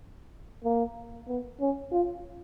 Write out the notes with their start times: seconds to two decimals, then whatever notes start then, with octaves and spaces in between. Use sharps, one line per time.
0.64 A#3
1.28 B3
1.60 C#4
1.92 F4